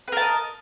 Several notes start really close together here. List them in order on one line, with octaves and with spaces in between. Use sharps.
B4 A#4 A5 D#5